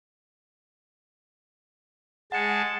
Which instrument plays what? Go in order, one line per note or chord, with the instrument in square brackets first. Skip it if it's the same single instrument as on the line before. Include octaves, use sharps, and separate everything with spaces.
[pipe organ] G#3 A5 [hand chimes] F#5 C#7